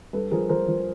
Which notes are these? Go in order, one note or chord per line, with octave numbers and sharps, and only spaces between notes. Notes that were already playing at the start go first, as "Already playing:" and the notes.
G2 A4 B4
F3 G#4 A#4
F3 A#4 C5
F3